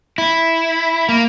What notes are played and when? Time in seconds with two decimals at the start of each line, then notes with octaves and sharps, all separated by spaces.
0.18 E4
1.09 A#3